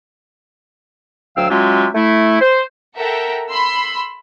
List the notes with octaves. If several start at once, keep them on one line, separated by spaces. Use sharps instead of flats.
D2 F#3 F5 G5 E6
F#3 G#3 C#4 F4 G4 E5
A3 E4
C5
A4 A#4 E5 F#5 G5 A#5
B5 C6 E6